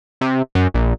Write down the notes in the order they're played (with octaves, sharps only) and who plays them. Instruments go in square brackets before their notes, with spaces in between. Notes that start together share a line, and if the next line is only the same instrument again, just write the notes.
[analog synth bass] C3
F#2
A#1